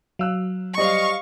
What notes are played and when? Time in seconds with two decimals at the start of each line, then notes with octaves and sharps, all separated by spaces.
0.19 F#3 F5 E6 F#6
0.78 G3 C5 D5 D#5 F5 C#6